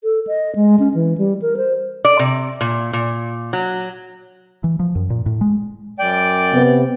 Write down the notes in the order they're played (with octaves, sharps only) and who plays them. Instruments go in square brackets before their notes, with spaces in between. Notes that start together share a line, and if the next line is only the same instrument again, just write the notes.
[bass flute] A4
D#5
G#3
C#4
E3
G3
A#4
C5
[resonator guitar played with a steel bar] D5
C3
A#2
A#2
F#3
[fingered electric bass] E3
F3
F#2
A#2
A2
G#3
[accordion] F#2 D5 G5
[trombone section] C3 B3